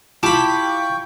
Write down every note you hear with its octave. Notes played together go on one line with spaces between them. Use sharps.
E4 F4 G4 G5 A5 B5 C#6 D6